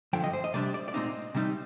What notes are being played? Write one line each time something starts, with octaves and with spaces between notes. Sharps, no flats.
G2 D3 F3 G5
D#5
C5
D#5
C3 G3 D4 D5
D5
D5
A#2 G#3 C4 D#4 D#5
C3 G3 C4 D#4